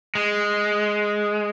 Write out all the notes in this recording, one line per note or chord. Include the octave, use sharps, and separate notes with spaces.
G#3